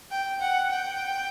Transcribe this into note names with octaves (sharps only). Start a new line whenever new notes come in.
G5
F#5
G5